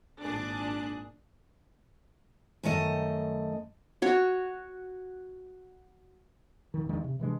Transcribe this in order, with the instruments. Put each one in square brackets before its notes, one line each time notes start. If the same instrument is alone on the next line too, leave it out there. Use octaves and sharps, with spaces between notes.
[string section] G#1 A#2 D4 G#4 F#6
[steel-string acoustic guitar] F#2 D#3 A3 D#5
[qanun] F#4 C#5
[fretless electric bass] D#1 D#3
E2 D#3 G#3 D4
C3
C3 E3 G#3 D4